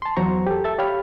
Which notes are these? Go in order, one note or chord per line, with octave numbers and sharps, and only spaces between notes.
A5 C6
E2 F#3 C5 A#5 C#6
G4 A4
A4 E5 A6
G4 C#5 F5 G5 B5 F6